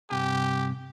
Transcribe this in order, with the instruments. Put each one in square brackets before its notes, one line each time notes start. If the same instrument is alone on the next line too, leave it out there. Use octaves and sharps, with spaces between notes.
[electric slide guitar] G2 C3 G#5 [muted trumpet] G4